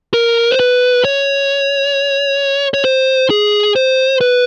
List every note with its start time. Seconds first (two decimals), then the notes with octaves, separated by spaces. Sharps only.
0.14 A#4
0.51 C5
0.60 B4
1.05 C#5
2.74 C#5
2.85 C5
3.30 G#4
3.76 C5
4.21 B4